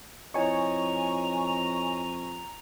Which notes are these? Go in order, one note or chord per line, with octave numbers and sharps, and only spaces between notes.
F2 E4 C#5 D#5 G#5 A#5 C#6